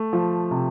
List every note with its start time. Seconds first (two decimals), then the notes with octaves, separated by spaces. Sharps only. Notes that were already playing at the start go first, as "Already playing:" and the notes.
Already playing: A3
0.13 F3
0.51 C3